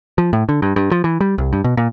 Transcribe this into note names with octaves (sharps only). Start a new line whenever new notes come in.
F3
A2
D3
G2
G2
F3
E3
G3
C2
G2
B2
A#2